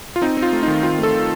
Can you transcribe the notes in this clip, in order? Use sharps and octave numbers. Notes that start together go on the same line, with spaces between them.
F4
C4 D#4
C4
F4
A3
D#3 D#4
C4 F4
A3 A4
D#3